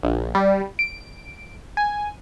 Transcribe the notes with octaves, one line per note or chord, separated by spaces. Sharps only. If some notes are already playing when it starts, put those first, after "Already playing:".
A#1
G3
D7
G#5